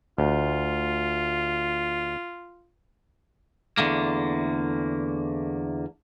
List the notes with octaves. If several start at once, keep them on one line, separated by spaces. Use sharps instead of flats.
D2 F4
E2 D3 A3 A#3